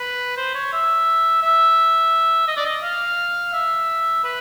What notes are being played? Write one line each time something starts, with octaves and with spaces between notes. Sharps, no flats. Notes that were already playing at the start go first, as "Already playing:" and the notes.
Already playing: B4
C5
C#5
E5
E5
D#5
D5
D#5
F5
E5
B4